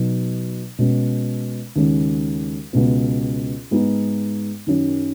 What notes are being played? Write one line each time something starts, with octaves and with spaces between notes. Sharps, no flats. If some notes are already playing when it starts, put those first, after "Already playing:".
Already playing: B2 F#3 D#4
B2 G#3 C#4
D#2 C#3 G#3 C#4
C#2 B2 B3
G#2 G#3 B3 D#4
F#2 D#3 F#3 C#4